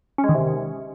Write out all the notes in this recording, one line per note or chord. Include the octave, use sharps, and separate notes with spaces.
C#4
G#3
D#3
C3